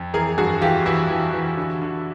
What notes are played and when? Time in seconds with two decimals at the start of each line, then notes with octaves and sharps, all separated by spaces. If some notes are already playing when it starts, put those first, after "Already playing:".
Already playing: F2
0.14 E3 G#4 A#4
0.38 G2 F#4 G#4
0.61 E3 F4 G4
0.86 E3 E4 F#4
1.10 E3
1.33 E3
1.57 D3
1.82 D3